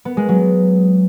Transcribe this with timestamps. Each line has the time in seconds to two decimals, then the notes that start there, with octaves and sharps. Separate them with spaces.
0.05 B3
0.17 G#3
0.29 F#3